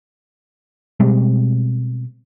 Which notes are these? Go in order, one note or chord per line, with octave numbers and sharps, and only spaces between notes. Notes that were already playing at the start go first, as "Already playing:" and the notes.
B2 G3 G#3 C4